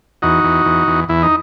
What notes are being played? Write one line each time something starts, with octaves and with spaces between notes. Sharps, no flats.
E2 D#4 F#4
E2
E2
E2
E2 E4
D#4